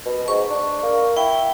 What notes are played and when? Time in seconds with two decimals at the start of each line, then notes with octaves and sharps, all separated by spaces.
0.06 B2
0.28 G#2 C#6
0.50 D4
0.83 A#3
1.17 E4 G5